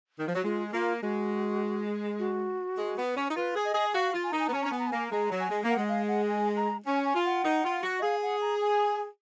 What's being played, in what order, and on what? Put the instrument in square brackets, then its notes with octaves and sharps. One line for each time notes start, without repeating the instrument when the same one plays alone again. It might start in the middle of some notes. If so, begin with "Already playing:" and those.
[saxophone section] D#3
F3
F#3
[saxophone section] G#3 [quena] F4
[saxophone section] A#3 [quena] F4
[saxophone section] G#3 [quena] F#4
[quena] F#4
[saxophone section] G#3
B3
C#4
D#4
[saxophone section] F4 [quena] B4
[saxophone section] G#4
[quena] D#5
[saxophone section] G#4
[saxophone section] F#4 [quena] F5
[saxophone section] F4
[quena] G#5
[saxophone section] D#4 [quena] A#5
[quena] G#5
[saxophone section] B3 [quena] A#5
[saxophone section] C#4
[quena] G#5
[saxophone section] C#4 [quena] A#5
[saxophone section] B3 [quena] G#5
[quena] A#5
[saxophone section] A#3 [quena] G#5
[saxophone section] G#3 [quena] A#5
[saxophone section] F#3
[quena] G#5
[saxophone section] G#3
A#3
[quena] F#5
[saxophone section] G#3
[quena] F5
F#5
G#5
A#5
[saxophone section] C#4 [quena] G#5
[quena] G#5
[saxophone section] F4
[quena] F#5
[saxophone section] D#4
F4
F#4
[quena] D#5
[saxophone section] G#4 [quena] F5
[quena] F#5
A#5
G#5